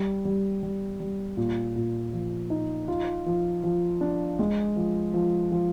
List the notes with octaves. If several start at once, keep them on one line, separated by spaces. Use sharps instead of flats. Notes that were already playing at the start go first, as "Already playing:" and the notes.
Already playing: G3
G3
G3
G3
A#2
A#2
F3
D#4
F4
F3
F3
D4
G#3
F3
F3
F3